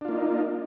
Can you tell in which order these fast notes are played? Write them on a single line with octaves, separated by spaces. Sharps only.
D4 F4 A#3 D#4